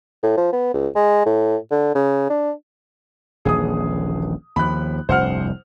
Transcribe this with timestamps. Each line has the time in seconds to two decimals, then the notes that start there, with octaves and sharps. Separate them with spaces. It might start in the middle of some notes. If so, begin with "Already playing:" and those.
0.23 A2
0.37 F3
0.53 B3
0.74 C#2
0.96 G#3
1.26 A2
1.71 D3
1.95 C#3
2.30 D4
3.45 D#1 A#1 E3 G#4 D#6
4.56 D#2 F3 B5 F#6
5.09 F1 C2 G2 C5 F#5 F6